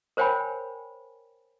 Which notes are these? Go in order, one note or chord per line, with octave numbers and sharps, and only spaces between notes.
A#4 C5 C#5 G5 G#5 B5